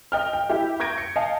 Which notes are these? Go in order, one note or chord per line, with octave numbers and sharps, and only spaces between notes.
D#5 G5 F6
G5
E4 G4
C#6 G6 G#6 A#6 D7
C#7
D#5 F5 G#5 A5